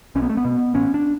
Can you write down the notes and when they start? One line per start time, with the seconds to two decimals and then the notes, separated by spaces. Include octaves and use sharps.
0.15 B1 C#4
0.22 B3
0.30 A3
0.37 B3
0.45 B2
0.74 A1 C#4
0.94 D4